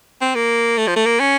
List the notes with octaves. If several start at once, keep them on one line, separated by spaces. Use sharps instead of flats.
C4
A#3
A3
F3
A3
A#3
C#4